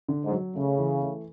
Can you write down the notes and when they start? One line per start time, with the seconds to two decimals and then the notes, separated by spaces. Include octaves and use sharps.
0.09 D3
0.24 G#2
0.31 F#3
0.55 C#3 A3
0.78 E3
1.02 A3